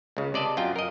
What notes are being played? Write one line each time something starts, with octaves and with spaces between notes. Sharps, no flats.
C#2 C#3
C3 D5 D#5 A5
F#2 F4 G5
A#4 D#5